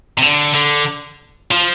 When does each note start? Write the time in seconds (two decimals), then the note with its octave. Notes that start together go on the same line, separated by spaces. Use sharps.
0.18 C3
0.22 D3
0.54 D3
1.51 F3